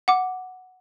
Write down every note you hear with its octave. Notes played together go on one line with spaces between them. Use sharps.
F#5 D6